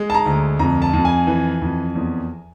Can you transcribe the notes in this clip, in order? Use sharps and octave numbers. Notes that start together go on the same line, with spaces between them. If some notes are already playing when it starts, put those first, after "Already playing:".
Already playing: G#3
A5
A#5
D2
F2 A#5
A5
F2
G#5
E3
F2
E2